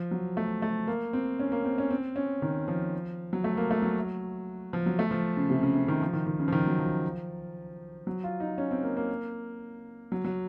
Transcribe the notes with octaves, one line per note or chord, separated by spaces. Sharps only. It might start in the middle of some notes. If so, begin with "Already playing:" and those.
Already playing: F3
F#3
A3
A3
A#3
C4
C#4
A#3
C4
C#4
C4
C#4
D#3
F3
F#3
A3
A#3
A3
F#3
F3
F#3
A3
F3
C#3
C3
C#3
C#3
D#3
F3
D#3
D#3
C#3
F3
D#3
F#3
F3
F#3
F4
D#4
C#4
C4
A#3
A#3
F#3
F#3